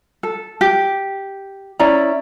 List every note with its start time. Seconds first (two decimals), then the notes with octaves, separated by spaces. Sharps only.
0.23 A4
0.61 G4
1.79 C#4 E4 D5 A#5